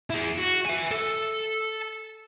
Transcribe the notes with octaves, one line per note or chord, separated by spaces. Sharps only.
E4 G#4
F#4
E5 G#5
A4